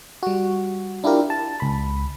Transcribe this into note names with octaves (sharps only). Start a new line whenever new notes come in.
G3 F#4
D4 E4 F4 G4 A#4
A5
C#2 B5